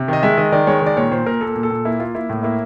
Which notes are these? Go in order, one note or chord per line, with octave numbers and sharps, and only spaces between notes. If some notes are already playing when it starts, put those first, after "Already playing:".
Already playing: C3
D#3 D#5
G#3 E5
D#3 D#5
D#3 D5
G#3 C#5
D#3 D5
A#2 C#5
A#2 C5
A#2 A#4
A#3 A4
A#2
A4
A#2
A#3 E4
A#3 F4
A#3 E4
A2
A#3 E4